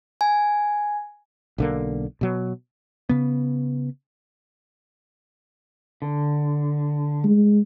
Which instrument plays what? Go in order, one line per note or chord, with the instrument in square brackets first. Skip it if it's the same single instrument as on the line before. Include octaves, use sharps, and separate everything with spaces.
[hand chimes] G#5
[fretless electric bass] B1 D3 A#3
B2 F#3
[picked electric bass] C#3 B3
[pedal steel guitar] D3
[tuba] G#3